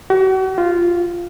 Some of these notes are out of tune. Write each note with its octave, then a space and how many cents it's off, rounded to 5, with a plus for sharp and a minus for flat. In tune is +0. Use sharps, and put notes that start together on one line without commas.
F#4 +40
F4 -5